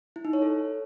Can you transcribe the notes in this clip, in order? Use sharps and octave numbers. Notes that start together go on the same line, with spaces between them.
E4
D#4
C#5
A4